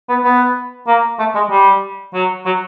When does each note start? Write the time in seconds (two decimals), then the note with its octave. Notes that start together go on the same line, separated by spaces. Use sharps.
0.09 B3
0.24 B3
0.87 A#3
1.19 A3
1.35 G#3
1.51 G3
2.14 F#3
2.46 F#3